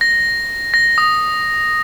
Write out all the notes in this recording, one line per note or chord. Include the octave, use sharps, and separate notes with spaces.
A#6
A#6
D#6